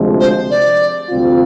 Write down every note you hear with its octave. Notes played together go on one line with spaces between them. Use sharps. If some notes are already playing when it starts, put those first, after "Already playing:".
Already playing: D2 C3 F3 G#3
C5
D5
D2 C3 G3 C4 F4